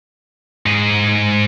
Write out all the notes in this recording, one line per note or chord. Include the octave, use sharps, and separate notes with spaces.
G#2 G#4